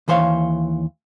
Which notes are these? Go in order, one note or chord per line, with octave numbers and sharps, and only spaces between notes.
D#2 E3 C5 C#5 F5